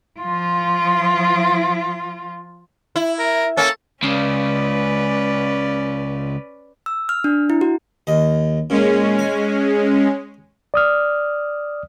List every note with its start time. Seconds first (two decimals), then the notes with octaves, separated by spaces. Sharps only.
0.20 F3 F4
2.96 E4
3.19 A#4
3.57 A#3 C#4 A4
4.03 C#2 C#3 C#4 B4 D5
6.86 E6
7.09 F6
7.24 D4
7.50 E4
7.61 F#4
8.07 D#2 D#5
8.70 A#2 G#3 C#4
9.19 G#5
10.74 D5 D#6 F6